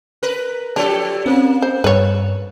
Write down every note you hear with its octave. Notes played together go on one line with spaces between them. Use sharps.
A#4 B4
F3 D4 G4 A4
A#3 C4 C#4
C5
G2 B4 C#5